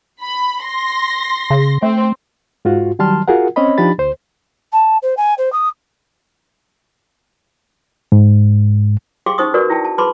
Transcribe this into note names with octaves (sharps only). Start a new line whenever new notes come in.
B5
C6 A#6
C#3
A3 C4
G#2 F4 F#4
D#3 F#3 G3 A5 C6 F6
F4 F#4 G#4 A#4 F#5
C4 C#4 C#5 D#5 B5
F3 D4 D#4 G4 B5 A6
D2 C5
A5
C5
G#5
C5
D#6
G#2
G4 G#4 F5 G5 C6 D6
C#4 D#4 C5 C#6 D#6
F#4 A#4 B4 D5 C#6
E4 G5 A5
A5
G#4 B4 A5 B5 C6 D6